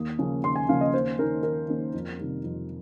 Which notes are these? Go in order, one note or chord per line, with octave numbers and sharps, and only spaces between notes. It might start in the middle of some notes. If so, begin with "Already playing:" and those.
Already playing: D#2 D#6
C#3 F3 A#3 C#4
D#2 C6
G#5
C#3 F3 A#3 C#4 F5
D#5
D#2 C5
D#3 A#3 C#4 A#4
D#2 A#4
D#3 A#3 C#4
F2
C3 D#3 G3
F2